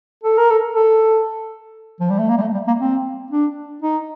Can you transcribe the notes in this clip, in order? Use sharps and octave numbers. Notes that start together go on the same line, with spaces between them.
A4
A#4
A4
A4
F3
G3
A3
A#3
G3
A3
G3
A#3
C4
D4
D#4